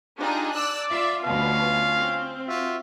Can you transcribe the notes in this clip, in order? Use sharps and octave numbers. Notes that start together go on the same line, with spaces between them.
D4 D#4 F4 G4 G#4
D5 E6 F#6
F4 E5
D2 B2 C#4 F4 F5
C4
F4 F#4 E5